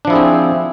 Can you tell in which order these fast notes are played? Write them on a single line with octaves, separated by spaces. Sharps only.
D4 F3 E4 G#4 C4